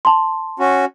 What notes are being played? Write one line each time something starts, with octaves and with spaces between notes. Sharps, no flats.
A5 C6
C#4 F#4